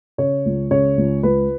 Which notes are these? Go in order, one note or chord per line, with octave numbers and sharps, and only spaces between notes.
C#3 C#5
C#2
C#3 C#5
C#2
C#2 B4